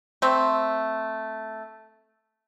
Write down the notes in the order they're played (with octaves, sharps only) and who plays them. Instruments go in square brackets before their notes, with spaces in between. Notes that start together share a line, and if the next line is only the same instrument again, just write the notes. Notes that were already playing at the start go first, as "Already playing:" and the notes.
[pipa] A3 C4